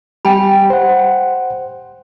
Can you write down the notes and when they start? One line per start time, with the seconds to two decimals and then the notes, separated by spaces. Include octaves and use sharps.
0.25 G3 G4 G5 G#5 B5
0.70 C5 F#5